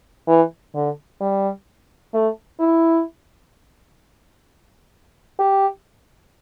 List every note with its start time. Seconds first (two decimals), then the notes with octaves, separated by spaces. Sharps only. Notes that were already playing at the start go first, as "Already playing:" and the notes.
0.28 E3
0.75 D3
1.21 G3
2.14 A3
2.60 E4
5.39 G4